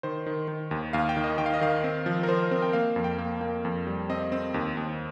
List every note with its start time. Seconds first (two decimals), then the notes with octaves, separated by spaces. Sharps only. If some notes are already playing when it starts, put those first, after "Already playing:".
0.03 D#3 C5
0.26 D#3
0.48 D#3
0.71 D#2
0.93 D#2 F5
1.09 G5
1.17 D#3
1.24 D#5
1.38 D#3 G5
1.46 F5
1.54 D#5
1.61 D#3 F5
1.84 C4
2.06 F3
2.23 A#4
2.28 F3 C5
2.51 C4
2.62 G5
2.73 A#3 F5
2.96 F2
3.04 G5
3.18 A#3
3.41 A#3
3.65 F2
3.87 G3
4.10 C4 D#5
4.32 C4
4.54 D#2
4.77 D#2